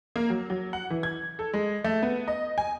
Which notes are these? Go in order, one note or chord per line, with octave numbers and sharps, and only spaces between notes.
A#3
F#3
F#3
F#5
E3
G#6
A4
G#3
A3
B3
D#5
G#5